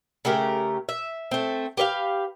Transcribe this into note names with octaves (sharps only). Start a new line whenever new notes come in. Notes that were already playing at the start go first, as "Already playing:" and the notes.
C#3 A3 G4 A#4
E5
A3 C4
G4 B4 D5 F5